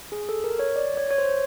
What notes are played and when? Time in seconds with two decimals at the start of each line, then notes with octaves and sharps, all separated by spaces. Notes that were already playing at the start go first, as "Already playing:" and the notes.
0.12 G#4
0.29 A4
0.44 A#4
0.59 C#5
0.76 D5
0.97 C#5
1.11 C#5
1.18 C5